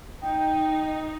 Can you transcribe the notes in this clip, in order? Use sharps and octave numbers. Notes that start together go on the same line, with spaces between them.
D#4 G5